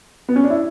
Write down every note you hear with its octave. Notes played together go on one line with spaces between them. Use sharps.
B3
C#4
D4
E4